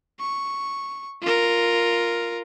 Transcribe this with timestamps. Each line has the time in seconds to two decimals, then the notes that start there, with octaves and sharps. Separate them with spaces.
0.19 C#6
1.21 F4 A#4